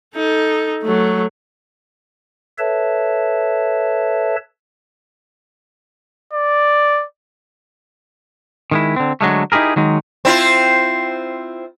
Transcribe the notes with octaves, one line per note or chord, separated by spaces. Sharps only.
D#4 A4
F#3 A3
A4 B4 C#5 E5 A5
D5
D#3 G#3 E4
D3 C4
D3 F#3 G#3 A3
D#4 E4 G4 G#4 A#4
D#3 F#3 G#3 D#4
C4 E4 F4